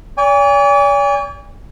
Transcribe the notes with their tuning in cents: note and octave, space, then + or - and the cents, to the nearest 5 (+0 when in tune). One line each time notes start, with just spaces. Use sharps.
D5 -45 G#5 -35